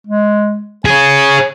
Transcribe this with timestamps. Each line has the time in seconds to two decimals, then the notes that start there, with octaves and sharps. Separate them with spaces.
0.07 G#3
0.85 G#4 C#5 G#5